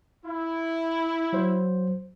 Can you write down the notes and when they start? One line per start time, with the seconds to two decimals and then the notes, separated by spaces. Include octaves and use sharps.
0.24 E4
1.33 F#3 C5